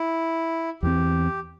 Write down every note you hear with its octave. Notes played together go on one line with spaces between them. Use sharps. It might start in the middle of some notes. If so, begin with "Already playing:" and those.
Already playing: E4
E2 E3 C4 G4